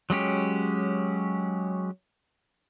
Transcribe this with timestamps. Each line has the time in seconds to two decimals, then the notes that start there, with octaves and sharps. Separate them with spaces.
0.10 F#3 G#3 C#4 G4